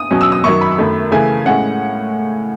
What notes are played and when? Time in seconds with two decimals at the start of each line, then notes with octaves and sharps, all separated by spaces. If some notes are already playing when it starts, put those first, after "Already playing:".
Already playing: D#6
0.11 E2 B2 F#3 C#4
0.21 E6
0.32 D#6
0.44 F#2 D#3 F#3 C#6
0.61 B5
0.78 F#2 D#3 A3
1.11 C#3 E3 A3 G#5
1.46 A2 G#3 C#4 F#5